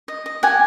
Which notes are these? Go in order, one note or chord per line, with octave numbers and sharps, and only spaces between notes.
D#5
D#5
G4 F#5 G#5